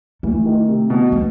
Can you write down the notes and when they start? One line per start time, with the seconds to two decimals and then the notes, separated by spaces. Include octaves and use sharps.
0.23 E3 A3
0.45 D#3
0.68 C3
0.90 B2
1.12 A3